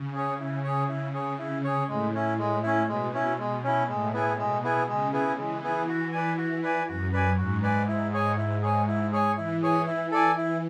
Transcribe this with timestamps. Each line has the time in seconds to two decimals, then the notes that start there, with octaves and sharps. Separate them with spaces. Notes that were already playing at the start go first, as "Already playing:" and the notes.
Already playing: C#3
0.15 G#4 C#5
0.40 C#3 E4
0.64 G#4 C#5
0.89 C#3 E4
1.14 G#4 C#5
1.39 E4
1.64 G#4 C#5
1.88 A2 G#3
2.14 C#4 E4
2.39 G#3
2.63 C#4 E4
2.88 B2 G#3
3.13 C#4 E4
3.39 B2 G#3
3.64 C#4 E4
3.88 A2 G#3
4.13 B3 E4 G#4
4.38 B2 G#3
4.64 B3 E4 G#4
4.88 C#3 G#3
5.13 B3 E4 G#4
5.38 E3 G#3
5.63 B3 E4 G#4
5.88 F#4
6.12 B4 D5 G#5
6.37 F#4
6.63 B4 D5 G#5
6.88 F#2 F#4
7.13 B4 D5 G#5
7.37 G#2 F#4
7.63 B4 D5 G#5
7.88 E4
8.13 G#4 C#5 G#5
8.38 E4
8.62 G#4 C#5 G#5
8.87 E4
9.12 G#4 C#5 G#5
9.37 E3 E4
9.62 G#4 C#5 G#5
9.87 E4
10.12 A4 D5 G#5
10.38 E3 E4